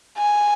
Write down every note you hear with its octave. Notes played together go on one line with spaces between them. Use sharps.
G#5